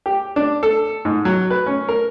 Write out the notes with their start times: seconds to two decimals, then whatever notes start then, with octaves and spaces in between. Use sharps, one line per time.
0.06 G4
0.36 D4
0.63 A4
1.05 G#2
1.25 F#3
1.50 B4
1.66 C#4
1.88 A#4